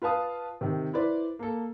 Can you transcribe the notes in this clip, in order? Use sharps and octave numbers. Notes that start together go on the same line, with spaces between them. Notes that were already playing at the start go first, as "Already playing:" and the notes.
F4 B4 F5 A5 D#6
C3 D#3
E4 B4 C5 D5
A#3 A4